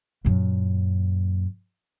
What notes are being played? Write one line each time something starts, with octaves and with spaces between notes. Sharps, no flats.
F#2 A#2